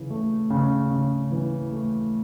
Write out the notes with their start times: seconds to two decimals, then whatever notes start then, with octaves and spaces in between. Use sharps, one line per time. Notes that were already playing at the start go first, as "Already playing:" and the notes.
Already playing: C#3 E3
0.10 A3
0.50 C#3
0.91 C#3
1.32 E3
1.71 A3